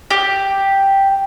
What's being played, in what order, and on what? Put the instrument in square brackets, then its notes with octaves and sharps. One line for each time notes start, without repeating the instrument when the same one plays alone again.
[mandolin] G4